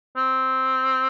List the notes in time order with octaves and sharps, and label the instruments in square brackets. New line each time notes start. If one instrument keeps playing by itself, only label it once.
[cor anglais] C4